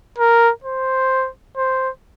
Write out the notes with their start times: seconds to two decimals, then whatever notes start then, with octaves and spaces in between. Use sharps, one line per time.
0.18 A#4
0.64 C5
1.57 C5